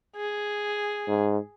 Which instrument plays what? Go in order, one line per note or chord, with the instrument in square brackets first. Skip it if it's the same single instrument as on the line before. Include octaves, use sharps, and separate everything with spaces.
[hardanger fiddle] G#4
[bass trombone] G#2